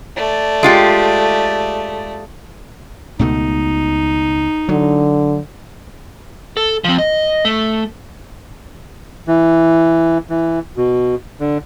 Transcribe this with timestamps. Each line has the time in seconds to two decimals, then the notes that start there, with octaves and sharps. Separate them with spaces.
0.16 A3 D5
0.63 G#3 F4 G4
3.19 C#2 B2 A3 D#4
4.69 D3 F#3
6.57 A4
6.84 F3 C4
6.98 D#5
7.45 A3
9.27 E3
10.30 E3
10.77 B2
11.40 D3